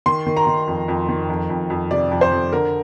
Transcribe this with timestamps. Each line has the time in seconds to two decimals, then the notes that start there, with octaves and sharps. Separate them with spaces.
0.06 D#3 C6
0.27 D#3
0.37 A#5
0.47 D#3
0.67 F2
0.88 F2
1.09 D#3
1.30 F2
1.50 F2
1.70 F2
1.91 C3 D5
2.11 F2
2.21 C5
2.32 F2
2.52 D3 A#4